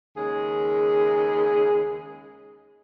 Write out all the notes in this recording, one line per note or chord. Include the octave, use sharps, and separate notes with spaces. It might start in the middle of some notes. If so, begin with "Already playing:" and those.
D#2 C#3 G#3 G#4